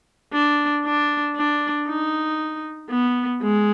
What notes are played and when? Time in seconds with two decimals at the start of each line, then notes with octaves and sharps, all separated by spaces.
0.33 D4
0.85 D4
1.36 D4
1.88 D#4
2.90 B3
3.42 G#3